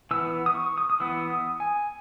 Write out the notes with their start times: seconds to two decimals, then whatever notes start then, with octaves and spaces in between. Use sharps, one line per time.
0.11 E3 B3 E6
0.46 D#6
0.55 C#6
0.78 D#6
0.90 D#6
1.00 E3 B3 E6
1.30 D#6
1.60 G#5